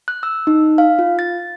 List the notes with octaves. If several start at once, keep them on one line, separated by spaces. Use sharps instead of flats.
F#6
E6
D#4
F5
F4
A6